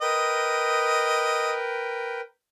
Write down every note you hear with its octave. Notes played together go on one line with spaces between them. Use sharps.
A#4 B4 D#5 G5